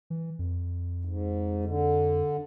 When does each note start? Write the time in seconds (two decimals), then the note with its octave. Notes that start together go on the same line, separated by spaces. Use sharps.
0.10 E3
0.39 F2
1.05 G#2
1.65 D3